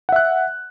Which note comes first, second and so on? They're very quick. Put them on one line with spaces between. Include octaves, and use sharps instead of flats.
F#5 E5 F#6